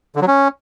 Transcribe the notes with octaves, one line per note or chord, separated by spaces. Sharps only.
D3
F#3
C#4